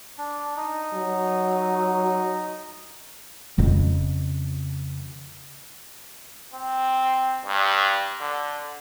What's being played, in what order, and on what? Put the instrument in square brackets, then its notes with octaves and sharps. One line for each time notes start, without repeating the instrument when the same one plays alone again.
[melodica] D4
D#4
[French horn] F#3
[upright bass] F2 C#3
[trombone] C4
G2
D3